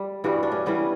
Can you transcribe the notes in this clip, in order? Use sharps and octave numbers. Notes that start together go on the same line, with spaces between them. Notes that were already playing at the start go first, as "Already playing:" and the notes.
Already playing: G3
G2 E3 G3 F#4
D4
C#4
E3 G3 B3